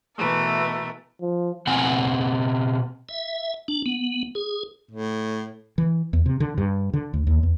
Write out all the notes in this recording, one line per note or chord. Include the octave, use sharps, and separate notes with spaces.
B2 E3 A3 A#4
F3
B2 B3 C4 F#5 G#5
E5
D4
B3
G#4
A2
E3
E2
C3
D3
G2
D3
D2
D#2
E2